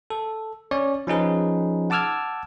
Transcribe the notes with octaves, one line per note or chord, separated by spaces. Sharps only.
A4
C#4 C#5 D5
F3 C#4 D#4 G#4 B4
F#5 A5 D6 E6 F6 G#6